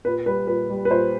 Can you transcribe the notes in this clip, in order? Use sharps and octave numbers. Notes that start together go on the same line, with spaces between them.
A#2 B4
G3 B4
A#2 B4
G3
B4
A#2 C5